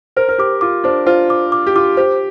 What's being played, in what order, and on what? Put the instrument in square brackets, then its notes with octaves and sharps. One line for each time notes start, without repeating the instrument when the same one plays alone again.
[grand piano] A#4 [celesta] C5
[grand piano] A#4
[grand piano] G4 [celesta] D6
[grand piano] F4 [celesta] D6
[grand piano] D4 [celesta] C5
[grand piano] F4 [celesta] C5
[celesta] D6
D6
[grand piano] G4
[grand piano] F4 [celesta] D6
[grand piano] G4 [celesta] C5